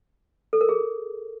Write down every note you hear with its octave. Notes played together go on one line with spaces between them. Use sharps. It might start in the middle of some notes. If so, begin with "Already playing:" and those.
A4
A#4
G#4